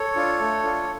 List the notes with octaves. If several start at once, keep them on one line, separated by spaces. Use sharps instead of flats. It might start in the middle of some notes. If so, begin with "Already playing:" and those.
Already playing: A4 C#5
D4 F4
A3
D4 F4